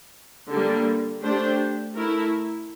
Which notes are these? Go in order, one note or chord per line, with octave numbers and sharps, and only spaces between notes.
D3 G3 A#3
A3 D4 G4 C5
A3 E4 A#4